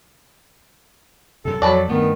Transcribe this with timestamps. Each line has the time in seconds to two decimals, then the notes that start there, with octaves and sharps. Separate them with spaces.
1.45 F#2 C3 A4
1.62 F2 F#3 D5 A5 B5
1.89 G2 D#3 A3 B3